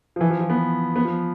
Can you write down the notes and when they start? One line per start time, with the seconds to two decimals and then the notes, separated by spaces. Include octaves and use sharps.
0.16 F3
0.21 E3
0.30 F3
0.40 F3
0.50 B3
0.96 B3
1.05 F3